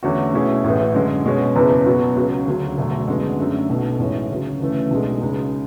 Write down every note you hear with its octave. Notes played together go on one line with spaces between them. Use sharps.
E2 D3 A3 C#4 F#4
B2 A3 C#4 E4 G#4
A1 A2 E3
F#2 D3 G#3
B2 G#3 C#4
F#1 E2 C#3 E3 B3
B2 F#3 B3 F#4
C#2 C#3 F#3
D2 C#3 F#3
E1 D2 D3 F#3 A3
G#1 F#2 D3 G#3 B3
F#2 D3 F#3 A3 D4
B1 B2 F#3
A1 A2 E3 G#3 C#4
D2 C#3 F#3
D2 C#3 E3 A3
B1 B2 G#3 D4
C#2 C#3 G#3